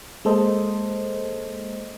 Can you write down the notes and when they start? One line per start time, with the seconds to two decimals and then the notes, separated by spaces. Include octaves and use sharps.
0.25 G#3 A#3 A4 C5 D#5